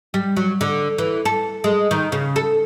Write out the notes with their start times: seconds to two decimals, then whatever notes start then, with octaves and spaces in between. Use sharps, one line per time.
0.14 G3
0.37 F#3
0.61 D3
0.98 E3
1.25 A4
1.64 G#3
1.91 D#3
2.12 C#3
2.36 A4